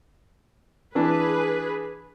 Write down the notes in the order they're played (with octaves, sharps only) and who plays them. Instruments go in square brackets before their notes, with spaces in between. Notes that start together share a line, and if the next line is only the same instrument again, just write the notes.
[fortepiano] E3 D4 [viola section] G#4 B4